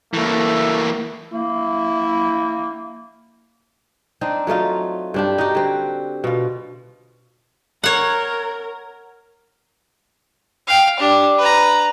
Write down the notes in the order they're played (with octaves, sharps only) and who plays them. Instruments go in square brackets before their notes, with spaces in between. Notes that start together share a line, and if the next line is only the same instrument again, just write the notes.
[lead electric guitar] E3 A#3 [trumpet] A3
[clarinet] A#3 [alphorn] E4
[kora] C4 D4 D#4
F#3 A3 D#4 F4
G2 D4 G4
D#4 F#4 G4
D3 C4
B2 F4
[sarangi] A#4 [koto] C#5 F#5
[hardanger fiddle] F5 G5
D4 G4
B4 A#5